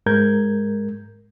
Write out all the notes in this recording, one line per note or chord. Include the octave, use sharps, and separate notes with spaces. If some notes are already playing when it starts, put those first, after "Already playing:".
G#2 G#3 A#4 G6 G#6